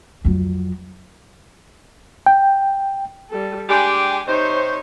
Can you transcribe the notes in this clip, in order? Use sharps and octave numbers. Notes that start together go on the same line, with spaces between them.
F2 F#3
G5
G3 A4
G#3 D4 G4 G#5
C3 D#4 C5 C#5